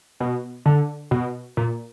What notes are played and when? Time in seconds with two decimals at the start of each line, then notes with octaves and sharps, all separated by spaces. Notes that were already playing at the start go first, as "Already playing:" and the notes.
0.20 B2
0.66 D3
1.11 B2
1.57 A#2